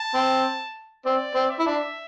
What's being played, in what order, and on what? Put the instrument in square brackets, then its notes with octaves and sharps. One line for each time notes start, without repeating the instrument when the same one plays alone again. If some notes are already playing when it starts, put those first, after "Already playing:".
Already playing: [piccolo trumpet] A5
[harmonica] C4
[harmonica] C4 [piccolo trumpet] D5
[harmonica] C4
[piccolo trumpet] E5
[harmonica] E4
D4